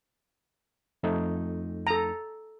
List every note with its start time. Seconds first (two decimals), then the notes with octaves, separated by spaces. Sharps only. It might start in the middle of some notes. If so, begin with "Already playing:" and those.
1.03 F2 A3 D#4
1.87 A4 A#5